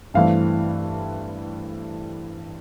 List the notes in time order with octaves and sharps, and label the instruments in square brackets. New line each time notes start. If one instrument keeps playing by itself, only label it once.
[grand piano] G2 E3 A3 C4 F5